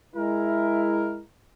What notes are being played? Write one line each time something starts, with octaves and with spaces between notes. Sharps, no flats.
G#3 E4 A#4